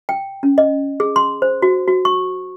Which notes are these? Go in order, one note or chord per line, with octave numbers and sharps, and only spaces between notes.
G5
C#4
D#5
G#4
C6
C5
F#4
F#4
C#6